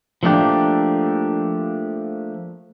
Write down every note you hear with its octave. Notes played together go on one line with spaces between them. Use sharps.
F3 A3 A#3 D4 G4